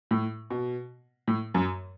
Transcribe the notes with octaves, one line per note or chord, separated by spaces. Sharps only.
A2
B2
A2
F#2